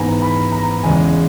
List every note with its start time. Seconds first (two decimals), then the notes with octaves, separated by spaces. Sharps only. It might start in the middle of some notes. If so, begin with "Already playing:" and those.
Already playing: G#2 E3 B3 G#5 A#5
0.22 B5
0.52 A#5
0.83 E2 C#3 G#3 G#5